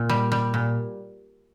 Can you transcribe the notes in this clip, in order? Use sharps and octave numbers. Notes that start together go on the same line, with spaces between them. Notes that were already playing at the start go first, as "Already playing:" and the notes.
Already playing: A#2
G3
G3
A#2